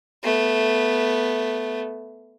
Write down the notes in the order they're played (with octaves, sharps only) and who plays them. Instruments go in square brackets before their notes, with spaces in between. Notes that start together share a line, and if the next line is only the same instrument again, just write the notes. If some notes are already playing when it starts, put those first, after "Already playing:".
[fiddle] A3 B3